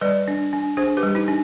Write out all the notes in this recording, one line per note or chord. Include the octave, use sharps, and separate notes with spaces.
G3 B4 D5
D4
D4
D4 G#4 C5
G4 B4
G3
D#4 G4
D4